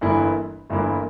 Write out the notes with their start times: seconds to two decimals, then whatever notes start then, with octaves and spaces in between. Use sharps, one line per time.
0.01 G1 G2 E3 A#3 E4
0.70 G1 G2 E3 A#3 E4